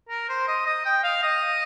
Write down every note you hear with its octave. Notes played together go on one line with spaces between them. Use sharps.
A#4
C5
D#5
D#5
G5
F5
D#5